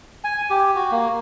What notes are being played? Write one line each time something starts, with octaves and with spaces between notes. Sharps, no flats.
G#5
G4
F#4
A#3